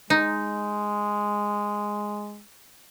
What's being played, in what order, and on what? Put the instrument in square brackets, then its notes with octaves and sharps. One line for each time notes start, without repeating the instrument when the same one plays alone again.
[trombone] G#3 [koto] D#4